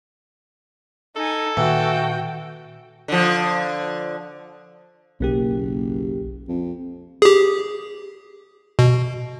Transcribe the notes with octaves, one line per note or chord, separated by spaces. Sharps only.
D#4 A4 G#5
A#2 D#3 E3 F#4 G5
D3 F3
F#1 B1 A#3 G4
F2
G4 G#4
B2